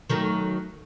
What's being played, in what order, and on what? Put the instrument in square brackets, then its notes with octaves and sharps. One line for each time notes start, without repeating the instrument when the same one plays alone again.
[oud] D#3 F#3 A3